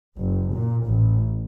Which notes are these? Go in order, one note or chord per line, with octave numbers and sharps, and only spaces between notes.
F#1
A#2
A1